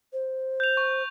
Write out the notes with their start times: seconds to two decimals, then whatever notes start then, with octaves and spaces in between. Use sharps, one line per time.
0.13 C5
0.60 G6 F7
0.77 C#6